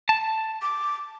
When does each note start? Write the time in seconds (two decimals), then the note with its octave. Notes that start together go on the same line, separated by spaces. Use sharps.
0.09 A5
0.62 D6